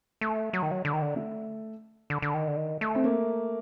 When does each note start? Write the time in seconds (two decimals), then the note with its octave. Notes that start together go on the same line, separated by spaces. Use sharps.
0.21 A3
0.53 F#3
0.62 D#3
0.71 F#3
0.85 D3
0.93 D#3
1.02 D3
1.16 A3
2.10 D3
2.22 D3
2.34 D#3
2.47 D3
2.57 D#3
2.81 A3
2.95 C4
3.04 A#3